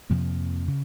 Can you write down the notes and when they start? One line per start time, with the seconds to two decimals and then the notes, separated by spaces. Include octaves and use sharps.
0.10 F2 C3 F3 A#3
0.68 C#3